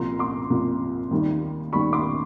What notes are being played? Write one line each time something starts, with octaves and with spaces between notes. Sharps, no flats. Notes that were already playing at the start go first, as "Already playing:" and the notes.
Already playing: C2 A#2 F3 A#5 C6
C6 D6
C2 A#2 F3
D#2 D#3 G3
D#2 D#3 G3 B5 C#6
C6 D6